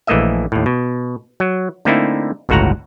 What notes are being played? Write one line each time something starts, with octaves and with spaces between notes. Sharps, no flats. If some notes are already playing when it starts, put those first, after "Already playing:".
A#1 E3 A3 A#3 D#5 E5
D#2 A2
B2
F#3
D3 A3 A#3 C4 D#4 E4
G1 C#2 A2 F#4 F#5 A#5